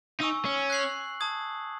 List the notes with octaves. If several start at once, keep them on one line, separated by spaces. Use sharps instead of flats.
D#4 G#5 C#6 E6
C#4
F#6 C7 F#7
A5 D#6 G#6